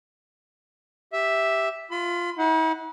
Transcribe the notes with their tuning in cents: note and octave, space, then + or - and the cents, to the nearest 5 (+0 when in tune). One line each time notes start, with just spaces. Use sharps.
G4 +0 E5 +0
F4 +0 B5 +40
E4 -45 F#5 +0